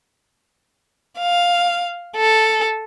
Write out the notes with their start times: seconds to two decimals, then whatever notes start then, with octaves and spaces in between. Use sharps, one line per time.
1.19 F5
2.17 A4